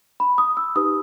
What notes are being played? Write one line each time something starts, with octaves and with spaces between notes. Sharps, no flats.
B5
D#6
E6
D#4 G4 B4 D#6